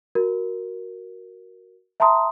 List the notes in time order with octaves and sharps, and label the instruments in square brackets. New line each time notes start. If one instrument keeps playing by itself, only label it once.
[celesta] F#4 A#4
E5 A5 A#5 C6 D#6